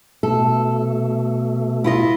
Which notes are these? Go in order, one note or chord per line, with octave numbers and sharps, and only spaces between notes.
B2 A3 A4
E4 F4 D#5